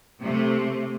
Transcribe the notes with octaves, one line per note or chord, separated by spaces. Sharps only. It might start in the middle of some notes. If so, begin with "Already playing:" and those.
C3 A3